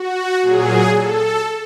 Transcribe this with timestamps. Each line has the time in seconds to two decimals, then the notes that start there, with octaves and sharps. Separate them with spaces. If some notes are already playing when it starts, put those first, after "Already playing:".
Already playing: F#4
0.42 A#2 F#3 G#4
0.94 A4